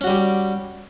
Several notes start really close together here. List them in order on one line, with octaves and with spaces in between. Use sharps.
C#4 F#4 G3 G4